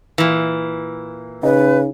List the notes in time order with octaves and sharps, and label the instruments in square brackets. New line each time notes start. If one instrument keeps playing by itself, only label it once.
[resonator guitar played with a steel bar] A#2 E3
[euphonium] C#3 [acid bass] D#4 [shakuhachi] B4